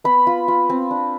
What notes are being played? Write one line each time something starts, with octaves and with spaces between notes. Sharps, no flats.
B3 B5
F4
F4
C4
D4